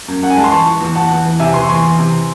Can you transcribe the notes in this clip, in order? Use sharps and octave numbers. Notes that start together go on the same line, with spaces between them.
F#2
F#2 F#5
G#5
G#3 A5
C6
E3 A5 C#6
E3
E2
E2 F#5 A5
E2
E3
C3 E5 G#5
E3 G#5 C6
C#6
E2 G#5 C6
E2
C3